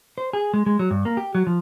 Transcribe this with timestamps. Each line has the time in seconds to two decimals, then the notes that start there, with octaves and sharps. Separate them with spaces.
0.18 C5
0.33 G#4
0.54 G#3
0.66 G#3
0.79 F#3
0.91 G2
1.05 A#3
1.17 G4
1.35 F#3
1.47 F3